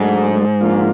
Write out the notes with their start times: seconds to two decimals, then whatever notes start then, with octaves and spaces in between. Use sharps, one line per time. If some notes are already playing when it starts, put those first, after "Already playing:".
Already playing: G#2 F#3 A3 D4
0.60 F3 A#3 D4 F4